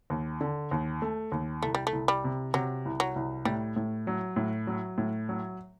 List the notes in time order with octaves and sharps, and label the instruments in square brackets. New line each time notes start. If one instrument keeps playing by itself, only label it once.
[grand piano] D#2
D3
D#2
A3
D#2
[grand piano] C2 [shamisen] A3
[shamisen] G3
A3
[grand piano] C2
[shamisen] G3
[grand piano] C3
[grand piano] C3 [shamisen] F#3
[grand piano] C2
[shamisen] F#3
[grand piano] C2
[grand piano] A2 [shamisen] G3
[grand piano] A2
F#3
A2
F#3
A2
F#3